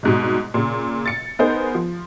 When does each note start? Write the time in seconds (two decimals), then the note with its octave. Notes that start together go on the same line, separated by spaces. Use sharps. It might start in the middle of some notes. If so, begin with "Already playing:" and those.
0.03 C2 G#2 B2
0.54 A#2 C#3
1.06 A6 C#7
1.39 B3 D#4 G#4 A#4 C5
1.75 F3